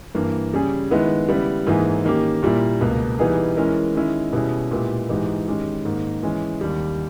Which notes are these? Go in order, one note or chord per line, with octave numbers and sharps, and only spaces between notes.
G2 E3 A#3
C#3 G3 C#4 G#4
D#3 G#3 B3 E4
C#3 G3 B3 E4
G#2 E3 A#3 E4 G#4
D#3 A#3 C#4 G4
A#2 G3 A#3 E4
C#2 B2 A#3
E3 G3 B3 D#4 G#4
E3 G#3 C#4 E4 A#4
D#3 G#3 C#4 E4
B2 G3 C#4 E4 G#4
A#2 G#3 B3 E4 G4
G#2 E3 G#3 D#4 G4
D#3 G#3 C#4 G4
G#2 D#3 A#3
E3 G#3 C#4
D#2 D#3 G3